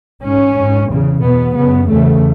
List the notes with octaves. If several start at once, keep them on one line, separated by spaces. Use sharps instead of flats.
G#2 C#4
G#2
E2 C#3
E2 B2 B3
F#2 C#3 B3
E2 C#3 A3